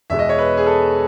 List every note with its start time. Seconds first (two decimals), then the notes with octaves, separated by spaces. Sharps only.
0.10 E2 B2 G#3 E5
0.19 D#5
0.29 C#5
0.38 B4
0.57 G#4
0.66 A4